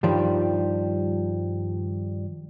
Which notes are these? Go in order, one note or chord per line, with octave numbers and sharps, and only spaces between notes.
G2 D#3 F3 G3